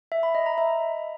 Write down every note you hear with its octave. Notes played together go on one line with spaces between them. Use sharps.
E5
B5
D#5
A#5
E5